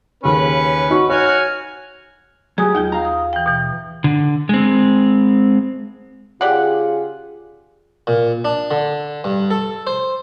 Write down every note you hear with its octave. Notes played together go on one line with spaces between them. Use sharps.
D#2 C#3 C#4 B4
D#4 F#4 C#6
F#4 C#5 G#5 F6
F#3 G4 G#4 G#5 D#6
D#2 D#4 F4 G6
F5 A#5
D#6
E3 G5
B2 E3
D3
G#3 C4
C#3 F4 G4 G#4 D5 F#5
A#2
D4
D3
G2
A4
C5